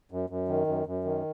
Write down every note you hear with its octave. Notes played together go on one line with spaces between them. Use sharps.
F#2
F#2
D#3
F#2
F#2
D#3